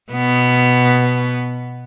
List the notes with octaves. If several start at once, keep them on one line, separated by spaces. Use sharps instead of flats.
B2 B3